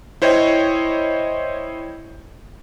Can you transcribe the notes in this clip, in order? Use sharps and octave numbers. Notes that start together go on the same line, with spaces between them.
E4 C5 C#5 D#5 G5